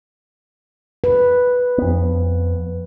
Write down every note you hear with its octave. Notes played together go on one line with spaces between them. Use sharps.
B4
F2 B3